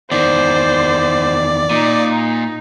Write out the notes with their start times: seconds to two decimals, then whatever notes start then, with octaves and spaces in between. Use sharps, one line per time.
0.11 E2 D#3 C5 D5
1.71 A#2 D#4